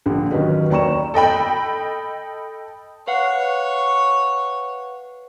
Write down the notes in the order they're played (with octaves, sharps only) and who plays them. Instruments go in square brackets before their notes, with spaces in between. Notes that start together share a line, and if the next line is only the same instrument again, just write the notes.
[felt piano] A#1 D3 G4
D#3 F#3 C#4 D#4 B4
D#2 D5 G5 A#5 C#6 E7
[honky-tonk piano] A4 D#5 G5 B5
[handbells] B4 F5 F#5 [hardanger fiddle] C#5